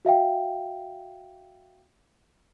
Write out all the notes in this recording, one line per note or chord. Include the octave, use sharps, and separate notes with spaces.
F#4 E5 F5 G5